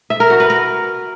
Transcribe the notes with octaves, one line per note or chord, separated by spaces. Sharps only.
E5
A#4
F#4
B4
A#4